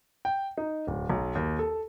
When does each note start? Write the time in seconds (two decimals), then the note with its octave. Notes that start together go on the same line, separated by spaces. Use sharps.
0.25 G5
0.57 D#4
0.87 D1
1.10 B1
1.35 D#2
1.59 A4